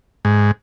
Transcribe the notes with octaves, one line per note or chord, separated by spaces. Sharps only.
G#2